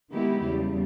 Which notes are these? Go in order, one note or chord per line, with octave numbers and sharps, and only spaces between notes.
D#3 G#3 B3 E4 G4
E2 C#3 G3